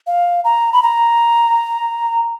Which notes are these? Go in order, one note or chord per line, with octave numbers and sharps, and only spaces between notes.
F5
A#5
B5
A#5